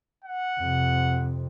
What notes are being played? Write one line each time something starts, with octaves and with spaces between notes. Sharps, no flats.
F#5
F2 C3